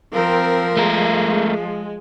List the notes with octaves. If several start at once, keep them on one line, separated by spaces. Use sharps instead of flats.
F3 C4 A#4
G#3 A3 A#4